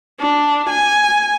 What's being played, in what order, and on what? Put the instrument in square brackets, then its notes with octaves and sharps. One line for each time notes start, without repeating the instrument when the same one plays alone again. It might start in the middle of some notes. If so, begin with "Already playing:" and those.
[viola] D4
G#5